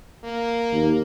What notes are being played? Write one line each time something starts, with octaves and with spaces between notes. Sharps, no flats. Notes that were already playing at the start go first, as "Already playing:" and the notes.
A#3
D#2